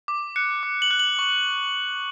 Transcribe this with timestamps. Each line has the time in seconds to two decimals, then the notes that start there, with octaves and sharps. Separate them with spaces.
0.08 D6
0.36 F#6 C#7
0.63 D6
0.82 F#7
0.91 F#6
0.99 F#7
1.19 C#6